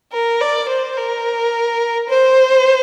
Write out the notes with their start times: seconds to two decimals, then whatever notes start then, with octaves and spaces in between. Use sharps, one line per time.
0.13 A#4
0.41 D5
0.69 C5
0.97 A#4
2.10 C5